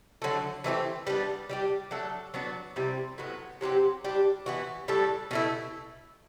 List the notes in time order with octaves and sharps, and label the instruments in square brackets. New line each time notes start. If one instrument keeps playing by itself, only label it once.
[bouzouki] D3 F#3 A3
E3 A3 C4 G4
G3 B3 D4
G3 D4 G4
F#3 A3 D4 A4
F#3 B3 D4 F#4
C3 G3 C4 E4
A2 F#3 B3
C3 F#3 C4 G4
G3 D4 G4
E3 B3 F#4
A2 G3 D4 A4
B2 A3 E4